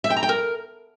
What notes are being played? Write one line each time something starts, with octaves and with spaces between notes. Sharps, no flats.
E5
G5
A#5
G5
A#4